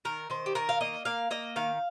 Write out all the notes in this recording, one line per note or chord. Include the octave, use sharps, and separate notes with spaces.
D#3 A#4
D#3 C5
G4
D#3 A#4
F5
A#3 D#5
A#3 F5
A#3 D#5
D#3 F5